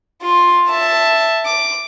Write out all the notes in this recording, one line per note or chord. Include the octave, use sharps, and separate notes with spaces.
F4
E5 A5
D6